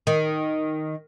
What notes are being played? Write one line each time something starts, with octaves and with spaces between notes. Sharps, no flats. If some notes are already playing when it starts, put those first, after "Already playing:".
D#3